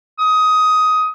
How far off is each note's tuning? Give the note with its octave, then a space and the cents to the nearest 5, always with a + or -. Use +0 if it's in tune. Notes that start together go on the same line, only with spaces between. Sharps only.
D#6 +15